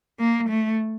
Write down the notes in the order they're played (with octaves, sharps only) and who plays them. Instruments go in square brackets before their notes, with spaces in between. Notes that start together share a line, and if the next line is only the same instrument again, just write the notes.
[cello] A#3
A3